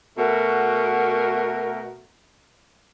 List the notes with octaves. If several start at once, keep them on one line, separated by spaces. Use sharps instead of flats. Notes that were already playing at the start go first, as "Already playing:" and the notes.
B2 A3 F#4 A#4